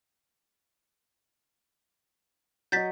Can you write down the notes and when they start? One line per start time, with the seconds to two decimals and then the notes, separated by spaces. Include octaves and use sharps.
2.72 F#3 D#5 G6 A6 B6